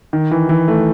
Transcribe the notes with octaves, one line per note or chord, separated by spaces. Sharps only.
D#3
E3
E3
A3